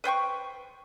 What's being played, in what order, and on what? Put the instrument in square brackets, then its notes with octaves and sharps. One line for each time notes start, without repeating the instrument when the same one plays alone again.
[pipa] B4 C5 G5 C#6